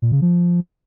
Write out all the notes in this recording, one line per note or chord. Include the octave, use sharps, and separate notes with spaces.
A#2
C#3
F3